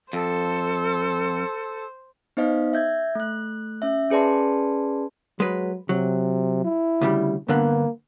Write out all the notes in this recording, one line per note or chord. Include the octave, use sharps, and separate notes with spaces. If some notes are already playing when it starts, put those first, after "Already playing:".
F2 A4 C5
B3 D#4 C5 D#5 F5
E5 G6 G#6
A3 F#6
C#4 E5
C#4 G#4 B4 D5 A5 C6
F#3 G#3 B4
C3 F#3
E4
D2 C#3 G3
G2 D3 A#3 B3